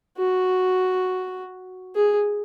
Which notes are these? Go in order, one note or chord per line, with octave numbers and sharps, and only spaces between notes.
F#4
G#4